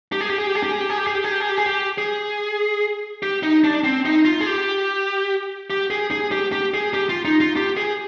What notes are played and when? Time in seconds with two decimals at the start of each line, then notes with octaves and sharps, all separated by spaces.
0.12 G4
0.21 G#4
0.30 G4
0.38 G#4
0.47 G4
0.55 G#4
0.63 G4
0.72 G#4
0.81 G4
0.90 G#4
0.97 G4
1.07 G#4
1.15 G4
1.24 G#4
1.32 G4
1.40 G#4
1.49 G4
1.58 G#4
1.66 G4
1.98 G#4
3.23 G4
3.43 D#4
3.64 D4
3.84 C4
4.05 D#4
4.25 F4
4.41 G#4
4.47 G4
5.70 G4
5.90 G#4
6.11 G#4
6.32 G4
6.52 G4
6.74 G#4
6.94 G4
7.09 F4
7.25 D#4
7.40 F4
7.56 G4
7.77 G#4